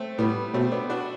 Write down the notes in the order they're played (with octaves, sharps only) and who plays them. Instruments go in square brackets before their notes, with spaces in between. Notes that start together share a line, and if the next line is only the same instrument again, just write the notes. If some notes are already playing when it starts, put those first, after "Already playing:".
Already playing: [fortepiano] A3 C4
[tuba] A2 [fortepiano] G3 B3
[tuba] B2 [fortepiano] A3 C4
[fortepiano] B3 D4
D4 F#4